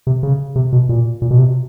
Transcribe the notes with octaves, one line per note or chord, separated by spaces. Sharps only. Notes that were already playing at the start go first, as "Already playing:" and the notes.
C3
C#3
C3
B2
A#2
A#2
B2
C3